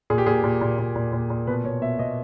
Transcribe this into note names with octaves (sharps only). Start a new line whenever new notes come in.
A#2 G#4
G4
A#2 G#4
A#2
A#2
A#2
A#2
A#2
A#2
B2 B4
B2 C#5
B2 E5
B2 D#5